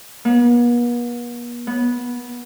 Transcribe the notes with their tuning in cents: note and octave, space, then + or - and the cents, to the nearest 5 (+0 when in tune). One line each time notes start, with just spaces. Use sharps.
B3 -45
B3 -15